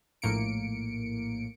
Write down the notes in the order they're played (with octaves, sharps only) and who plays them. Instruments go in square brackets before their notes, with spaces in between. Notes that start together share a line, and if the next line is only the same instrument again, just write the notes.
[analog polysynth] A#1 A2 A#3 C#7 D7